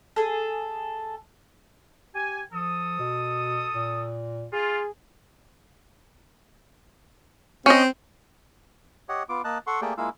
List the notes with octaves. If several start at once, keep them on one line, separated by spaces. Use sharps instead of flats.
G#4 A4
G4 G#5
F3 A4 D#6
B2
A#2
F4 G#4
C4 C#4 D#5
G4 C#5 D#5 F#5
B3 F4 D6
A#3 D#5 A5 F#6
A4 F#5 C6 C#6
A3 A#3 G4 G#4 D5 G5
G#3 A#3 E4 F4 F5 E6